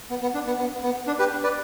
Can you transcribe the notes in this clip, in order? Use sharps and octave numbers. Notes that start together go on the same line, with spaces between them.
B3
B3
D4
B3
B3
B3
D4
G4 B4
B4 D5